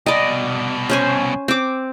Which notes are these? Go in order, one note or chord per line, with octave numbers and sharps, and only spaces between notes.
C2 B2 D5 D#5
C#4 C5 G#5
C4 D6